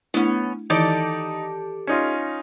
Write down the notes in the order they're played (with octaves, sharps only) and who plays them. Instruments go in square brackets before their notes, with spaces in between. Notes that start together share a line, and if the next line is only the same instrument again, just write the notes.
[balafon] A3 D4 E4 [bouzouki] B3 C#4
[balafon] D#3 E3 E4 [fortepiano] D#4 [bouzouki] G4 A4 D5
[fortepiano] C#4 D#4 F4